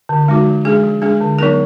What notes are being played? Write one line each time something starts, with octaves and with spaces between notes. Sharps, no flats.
D3
G#3 D#4 F#4
F3
G#3 D4 G#4
F3
G#3 D4 G#4
D3
F#3 B3 D#4 A#4